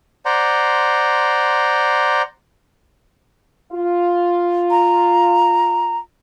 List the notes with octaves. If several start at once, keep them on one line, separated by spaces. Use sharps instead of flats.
C5 D5 F#5 A#5 C6
F4
A#5